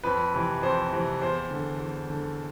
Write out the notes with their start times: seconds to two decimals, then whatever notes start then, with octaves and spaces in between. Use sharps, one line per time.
0.03 F2 B4
0.34 C3 E3
0.62 F2 C5
0.93 C3 E3
1.22 E2 C5
1.51 D3
1.80 E2
2.10 D3